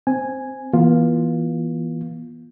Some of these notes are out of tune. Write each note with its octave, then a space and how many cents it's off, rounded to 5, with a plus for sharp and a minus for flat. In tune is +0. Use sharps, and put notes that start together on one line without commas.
C4 +0 G#5 -5
E3 +0 B3 -40 F4 +0